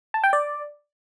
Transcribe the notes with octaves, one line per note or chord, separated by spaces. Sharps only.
A5
G5
D5